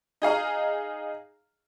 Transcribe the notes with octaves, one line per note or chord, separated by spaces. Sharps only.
D#4 G#4 F5 A#5